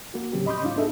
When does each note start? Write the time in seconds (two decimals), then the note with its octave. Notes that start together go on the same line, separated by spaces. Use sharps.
0.14 A#3 F#4
0.33 A2 C#3 F#3 C4 C#4 G4
0.46 D#5 B5 C6 D6 D#6 G6
0.63 G#2 C#4 D#4 F4 F5
0.76 B3 D4 D#4 G#4 A4 E5